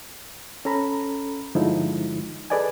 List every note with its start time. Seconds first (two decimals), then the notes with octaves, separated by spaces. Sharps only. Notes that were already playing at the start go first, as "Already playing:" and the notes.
0.65 C#4 A4 A#5 B5
1.55 G2 D3 F3 G#3 D#4 E4
2.50 G#4 A4 B4 D5 D#5 G#5